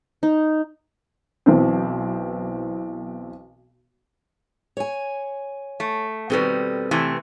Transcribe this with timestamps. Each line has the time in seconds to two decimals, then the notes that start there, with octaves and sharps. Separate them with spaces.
0.23 D#4
1.46 B1 E3 B3 C4
4.77 C#5 G#5
5.80 A3
6.30 B2 D#3 G3 C4 A4 B4
6.91 C3 E3 A3